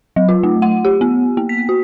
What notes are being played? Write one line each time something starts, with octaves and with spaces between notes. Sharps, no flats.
F#3
F4
A3
F#5
G4
B3
A#3
B6
F#4